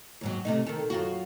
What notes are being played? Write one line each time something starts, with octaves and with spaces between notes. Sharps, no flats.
D#2 G#2 F#3
C3 A3 D#4
D#3 A4
F#2 F4 F#4